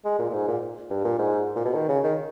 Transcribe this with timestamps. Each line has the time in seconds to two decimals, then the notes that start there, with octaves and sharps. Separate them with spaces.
0.05 G#3
0.19 A#2
0.30 A#2
0.33 G#2
0.48 A#2
0.90 G2
1.04 A#2
1.18 G#2
1.55 A#2
1.65 B2
1.74 D#3
1.88 C#3
2.04 D#3